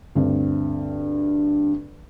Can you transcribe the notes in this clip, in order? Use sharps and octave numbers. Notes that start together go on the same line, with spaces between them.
D2 G2 C4